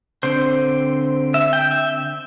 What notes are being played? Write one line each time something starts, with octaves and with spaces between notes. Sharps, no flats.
D3 C4 C5
E5
G5
E5